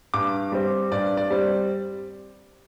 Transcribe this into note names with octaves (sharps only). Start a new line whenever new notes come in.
G2 D6
G3 C4
G2 D5
D5
G3 C4